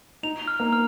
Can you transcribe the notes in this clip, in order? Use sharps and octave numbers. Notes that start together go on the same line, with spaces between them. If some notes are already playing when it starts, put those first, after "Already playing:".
D#4 F7
F6
A#3
F6